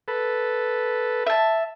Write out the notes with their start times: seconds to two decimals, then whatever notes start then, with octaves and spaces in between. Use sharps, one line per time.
0.08 A4 B4
1.27 E5 A5